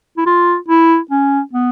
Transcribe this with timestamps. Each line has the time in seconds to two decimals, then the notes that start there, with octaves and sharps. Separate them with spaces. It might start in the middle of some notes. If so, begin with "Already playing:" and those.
0.17 E4
0.26 F4
0.68 E4
1.11 C#4
1.53 B3